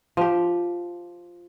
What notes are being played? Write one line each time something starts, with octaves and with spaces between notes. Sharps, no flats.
F3 G4